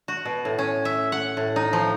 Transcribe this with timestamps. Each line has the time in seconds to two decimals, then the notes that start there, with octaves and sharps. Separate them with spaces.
0.08 F#4
0.25 B2
0.45 A2
0.59 C#4
0.85 E5
1.12 F#5
1.37 A2
1.56 D#4
1.73 F3